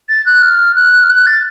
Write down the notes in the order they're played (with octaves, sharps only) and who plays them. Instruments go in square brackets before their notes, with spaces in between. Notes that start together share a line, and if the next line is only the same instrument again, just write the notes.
[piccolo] A6
F#6
F6
F#6
F6
F#6
A6